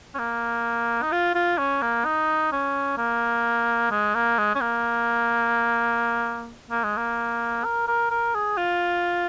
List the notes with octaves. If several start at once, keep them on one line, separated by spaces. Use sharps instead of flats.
C#4
A#3
D#4
F4
F4
C#4
A#3
D#4
C#4
A#3
G#3
A#3
G#3
C#4
A#3
A#3
G#3
A#3
A#4
A#4
A#4
G#4
F4